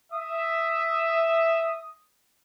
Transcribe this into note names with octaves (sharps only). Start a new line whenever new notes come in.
E5 D#6